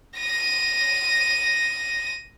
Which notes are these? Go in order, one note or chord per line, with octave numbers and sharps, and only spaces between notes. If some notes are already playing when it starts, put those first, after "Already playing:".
A#6 D#7